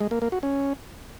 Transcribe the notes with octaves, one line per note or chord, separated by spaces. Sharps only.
G#3
A#3
A#3
F#4
C#4